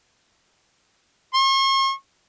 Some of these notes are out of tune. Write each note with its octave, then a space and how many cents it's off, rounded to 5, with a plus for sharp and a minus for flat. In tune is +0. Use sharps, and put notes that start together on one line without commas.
C#6 -45